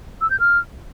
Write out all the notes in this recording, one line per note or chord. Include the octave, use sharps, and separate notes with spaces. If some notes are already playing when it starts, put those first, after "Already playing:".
E6
G6
F6